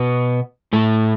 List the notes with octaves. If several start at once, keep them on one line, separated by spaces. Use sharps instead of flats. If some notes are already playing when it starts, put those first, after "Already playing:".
Already playing: B2 B3
A2 A3